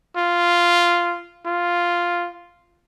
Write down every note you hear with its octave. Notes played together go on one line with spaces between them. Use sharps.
F4
F4